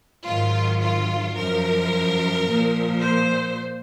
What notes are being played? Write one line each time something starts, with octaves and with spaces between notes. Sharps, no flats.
G#2 D#3 F#3 F4
F4
F#2 F3 A#4
A#2 F3
C5